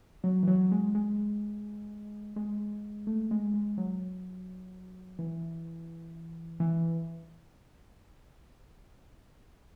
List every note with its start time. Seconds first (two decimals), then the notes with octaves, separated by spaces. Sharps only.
0.24 F#3
0.43 E3
0.47 F#3
0.72 G#3
0.95 G#3
2.36 G#3
3.07 A3
3.31 G#3
3.54 G#3
3.77 F#3
5.19 E3
6.60 E3